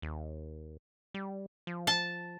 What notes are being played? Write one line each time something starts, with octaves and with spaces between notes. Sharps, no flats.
D#2
G3
F3
A5